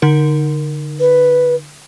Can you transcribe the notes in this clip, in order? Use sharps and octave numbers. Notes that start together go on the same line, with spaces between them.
D3 D#4 A#4
B4